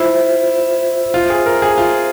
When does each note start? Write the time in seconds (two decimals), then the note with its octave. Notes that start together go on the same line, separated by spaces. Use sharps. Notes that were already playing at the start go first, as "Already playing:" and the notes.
Already playing: E4 F4 C5 E5
1.14 F4
1.30 G#4
1.46 A#4
1.62 G#4
1.78 F4